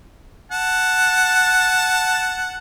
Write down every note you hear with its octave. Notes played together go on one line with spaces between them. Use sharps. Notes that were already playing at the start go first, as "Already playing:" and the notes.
F#5 A5